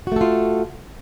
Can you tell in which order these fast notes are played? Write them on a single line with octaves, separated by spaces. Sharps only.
F#4 A3 A4 F4